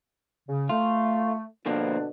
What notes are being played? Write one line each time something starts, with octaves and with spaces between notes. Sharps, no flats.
C#3
A3 F4
B2 D3 F3 A#3 C4 D4